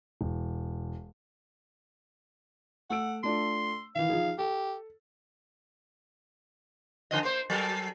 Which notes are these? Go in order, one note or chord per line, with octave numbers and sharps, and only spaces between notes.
E1
A3 F#5 E6 D7
A3 D4 F4 C6
D#3 E3 F5
F3 D#4 G#4
G4 A4
D3 F3 D#5
A#3 C5
F#3 A4 A#4